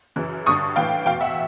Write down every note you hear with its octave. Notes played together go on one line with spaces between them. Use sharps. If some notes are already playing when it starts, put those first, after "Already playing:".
F#2 C#3 E3
G2 D3 C#6 D#6
A2 E3 F5 G5
E2 B2 F5 G5
E5 F#5